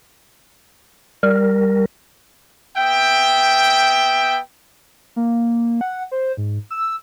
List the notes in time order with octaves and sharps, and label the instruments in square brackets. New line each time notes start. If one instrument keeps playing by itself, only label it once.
[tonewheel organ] G3 A#4
[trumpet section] B3 E5 G5
[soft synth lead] A#3
F#5
C5
G#2
E6